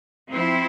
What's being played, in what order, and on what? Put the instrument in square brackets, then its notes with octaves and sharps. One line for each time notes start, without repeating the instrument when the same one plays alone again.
[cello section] F3 C4 E4